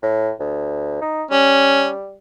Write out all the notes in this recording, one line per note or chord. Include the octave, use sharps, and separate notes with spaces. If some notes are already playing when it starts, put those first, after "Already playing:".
A2
D2
D#4
G3 C#4